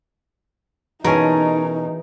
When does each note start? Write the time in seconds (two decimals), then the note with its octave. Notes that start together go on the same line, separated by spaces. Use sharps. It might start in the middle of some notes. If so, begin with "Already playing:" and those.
1.04 B2 E3 C#4 D#4 G#4 A#4 G#5 A5